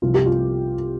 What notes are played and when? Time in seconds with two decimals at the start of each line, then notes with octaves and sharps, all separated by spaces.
0.02 C2 C3 F3 F4
0.14 G4
0.26 F4